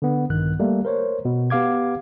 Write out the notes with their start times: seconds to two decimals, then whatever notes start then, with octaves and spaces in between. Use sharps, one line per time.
0.02 D3 B3
0.30 A#1 G2 D#3 F#6
0.60 G3 A3 A#3
0.85 A#4 C5 C#5
1.25 B2
1.50 B3 G4 F5 D6 G#6